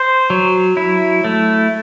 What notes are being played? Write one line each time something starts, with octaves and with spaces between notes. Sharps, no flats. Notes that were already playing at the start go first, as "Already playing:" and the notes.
Already playing: C5
F#3
E4
A3